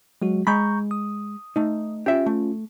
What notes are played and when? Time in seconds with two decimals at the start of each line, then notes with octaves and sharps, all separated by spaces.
0.22 F#3 G#3 F#4
0.47 G#3 A#5 B5 C#6 G6
0.91 D#6
1.56 A3 D#4
2.06 C#4 F4 G4 E5
2.26 A3